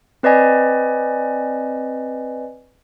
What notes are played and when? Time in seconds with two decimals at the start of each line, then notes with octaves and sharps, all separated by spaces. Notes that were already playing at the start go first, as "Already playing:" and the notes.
0.23 C4 B4 D5 D#5 G#5